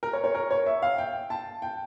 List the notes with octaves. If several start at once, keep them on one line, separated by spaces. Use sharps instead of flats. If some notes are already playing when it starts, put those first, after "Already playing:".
A#4
C#5
C#5
A#4
C#5
E5
F5
G5
A5
G5